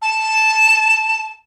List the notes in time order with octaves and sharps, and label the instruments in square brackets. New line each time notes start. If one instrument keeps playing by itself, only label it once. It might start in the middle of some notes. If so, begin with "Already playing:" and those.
[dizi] A5